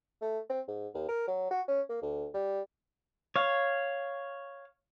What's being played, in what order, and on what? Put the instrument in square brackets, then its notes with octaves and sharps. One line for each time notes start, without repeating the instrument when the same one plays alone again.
[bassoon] A3
C4
G#2
D#2
A#4
F#3
F#4
C#4
A#3
D2
G3
[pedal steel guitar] C#5 F5